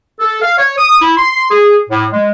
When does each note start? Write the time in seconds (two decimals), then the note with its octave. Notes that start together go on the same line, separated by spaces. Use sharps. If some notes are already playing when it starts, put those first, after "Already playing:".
0.19 A4
0.42 F5
0.58 C#5
0.78 D#6
1.01 E4
1.17 C6
1.50 G#4
1.90 A2
2.12 G#3